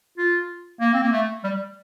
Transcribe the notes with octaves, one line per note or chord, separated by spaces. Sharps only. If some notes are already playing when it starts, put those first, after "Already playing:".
F4
A#3
C4
A#3
A3
G3